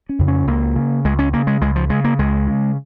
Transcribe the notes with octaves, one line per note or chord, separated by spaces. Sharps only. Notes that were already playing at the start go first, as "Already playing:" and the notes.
C#4
F2 C#3
C#4
C#2 A#3
C#3
C#2 G#3
C#4
C#3 A#3
G#3
C#2 G#3
F3
C#3 G#3
A#3
C#2 G#3
C#3